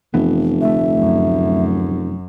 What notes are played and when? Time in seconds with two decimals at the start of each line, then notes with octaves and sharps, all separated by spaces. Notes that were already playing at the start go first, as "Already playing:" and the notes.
0.14 F1 F2 E3 B3
0.61 D2 A3 E5
0.98 F#2